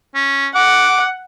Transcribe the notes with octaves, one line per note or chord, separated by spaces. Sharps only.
C#4
F#5 D6